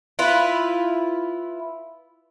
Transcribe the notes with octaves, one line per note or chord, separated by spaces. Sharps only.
E4 F4 B4